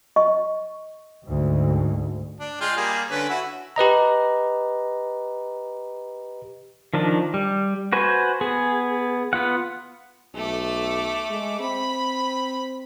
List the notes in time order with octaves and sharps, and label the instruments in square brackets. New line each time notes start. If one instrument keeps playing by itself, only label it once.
[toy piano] D#5 C#6
[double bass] D2 G#2
[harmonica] D4
G#3 F4 G5
G3 A#3 G#4
D3 C#4 B4
E4 F#4 E5
[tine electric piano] G4 B4 D#5 A#5
[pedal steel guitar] D#3 F3 D4
G3
F#4 B4 C5 G#5
B3 G#4
B3 F4 F#5
[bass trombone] B1 [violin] A3 D6
[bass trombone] G#3
[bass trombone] C4 [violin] B5